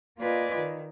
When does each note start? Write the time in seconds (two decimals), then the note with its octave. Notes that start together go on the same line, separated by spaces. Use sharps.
0.19 A#3 F4 B4 D5 D#5 G#5
0.56 D#3